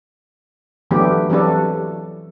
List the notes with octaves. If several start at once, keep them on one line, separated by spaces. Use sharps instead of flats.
D3 E3 F#3 A3 B3 G4
E3 F#3 G3 C4 D4 A4